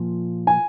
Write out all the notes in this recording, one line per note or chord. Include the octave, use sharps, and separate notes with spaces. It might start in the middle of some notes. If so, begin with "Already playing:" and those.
Already playing: A#2 F3
G#5